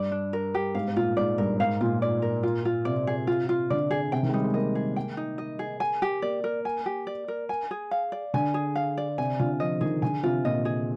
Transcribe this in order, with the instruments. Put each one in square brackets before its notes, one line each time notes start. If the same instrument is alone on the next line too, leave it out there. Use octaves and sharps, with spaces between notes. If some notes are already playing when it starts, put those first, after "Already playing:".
Already playing: [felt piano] G2 [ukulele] D5
[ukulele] D4
A#4
G4
[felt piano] G#2 [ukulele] F5
[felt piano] G#2
[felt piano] A#2 [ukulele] F4
[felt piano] G#2 [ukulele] D5
[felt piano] G2 [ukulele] A#4
[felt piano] G#2 [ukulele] F5
[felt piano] A#2 [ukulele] F4
[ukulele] D5
A#4
F4
F4
[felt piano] C3 [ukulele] D5
[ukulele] G#4
F4
F4
[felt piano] D3 [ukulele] D5
[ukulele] G#4
[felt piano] C3 [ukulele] G5
[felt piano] D#3
G#3
[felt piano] G3 [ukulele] D#4
[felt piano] G#3
[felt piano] A#3 [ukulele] D#5
[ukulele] G#4
G5
D#4
D#5
G#4
G#5
G4
[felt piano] A#3 [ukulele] D5
[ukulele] A#4
G#5
G4
D5
A#4
G#5
G#4
F5
D5
[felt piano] D3 [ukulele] G#5
[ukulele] G#4
F5
D5
[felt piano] C3 [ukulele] G#5
[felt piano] D3 [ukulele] F4
[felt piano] F3 [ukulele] D#5
[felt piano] D#3 [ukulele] G#4
[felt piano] D3 [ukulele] G#5
[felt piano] C3 [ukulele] F4
[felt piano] A#2 [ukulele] D#5
[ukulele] G#4